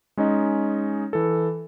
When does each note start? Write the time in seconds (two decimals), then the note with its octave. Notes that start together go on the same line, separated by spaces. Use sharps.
0.17 G#3 C#4 D#4 D#5
1.13 E3 A4